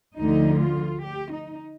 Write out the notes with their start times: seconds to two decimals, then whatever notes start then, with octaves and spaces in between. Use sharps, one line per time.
0.18 D2 D3 F3 D#4
0.61 F4
1.04 G4
1.32 D#4